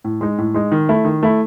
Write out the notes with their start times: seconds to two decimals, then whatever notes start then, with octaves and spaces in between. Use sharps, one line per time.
0.04 A2
0.21 G#3 D#4
0.38 A2
0.54 G#3 D#4
0.72 D#3
0.89 A3 E4
1.05 D#3
1.23 A3 E4